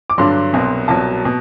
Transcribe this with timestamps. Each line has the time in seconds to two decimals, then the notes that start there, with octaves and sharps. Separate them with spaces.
0.10 D6
0.18 G2 D3 F#3 C6
0.53 C2 B2 F#3
0.88 C2 B2 F#3 A5
1.25 B2